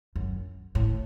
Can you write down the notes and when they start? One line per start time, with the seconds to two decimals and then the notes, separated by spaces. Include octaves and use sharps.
0.16 F#2
0.75 A2